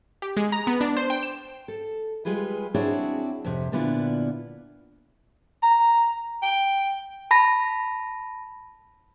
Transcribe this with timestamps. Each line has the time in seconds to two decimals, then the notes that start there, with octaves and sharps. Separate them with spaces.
0.22 G4
0.37 G#3
0.52 A#5
0.67 B3
0.81 D4
0.97 C5
1.10 G5
1.23 E7
1.68 A4
2.25 G3 G#3 F4 G#4 B4
2.74 C4 D4 E4 F#4 G#4 C#5
3.44 F2 C3
3.72 A#2 D3 B3 D4 E4 F4
5.63 A#5
6.42 G5
7.31 A5 B5 A#6